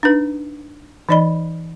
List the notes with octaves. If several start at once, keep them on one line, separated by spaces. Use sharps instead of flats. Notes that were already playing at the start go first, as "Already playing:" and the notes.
D4 D#4 B4
E3 D#4 D5 D#5 B5